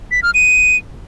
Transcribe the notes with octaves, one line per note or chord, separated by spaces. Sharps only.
B6
F6
D#7